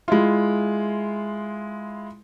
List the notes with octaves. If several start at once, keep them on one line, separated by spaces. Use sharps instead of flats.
G#3 E4 F4